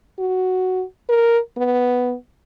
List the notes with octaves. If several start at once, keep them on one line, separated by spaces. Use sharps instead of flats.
F#4
A#4
B3